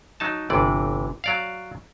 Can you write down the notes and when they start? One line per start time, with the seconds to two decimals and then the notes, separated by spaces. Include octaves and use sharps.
0.20 F#3 D#4 A5
0.50 G1 C3 E3 D5
1.24 F#3 D5 F5